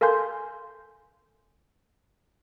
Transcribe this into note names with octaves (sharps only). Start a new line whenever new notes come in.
A4 A#4 F5 G#5 C6 G6